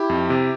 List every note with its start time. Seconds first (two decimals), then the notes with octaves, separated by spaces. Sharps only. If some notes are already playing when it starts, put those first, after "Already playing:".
Already playing: E4 G4
0.09 F2
0.30 C3